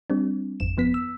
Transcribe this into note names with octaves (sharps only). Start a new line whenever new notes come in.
G3 C4 D4
G#1 F2 E7
G1 F3 B3 B6
E6